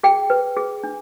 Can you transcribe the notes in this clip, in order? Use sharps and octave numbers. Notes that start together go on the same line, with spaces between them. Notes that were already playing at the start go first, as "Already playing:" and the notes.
G#4 G5
B4
G#4
D4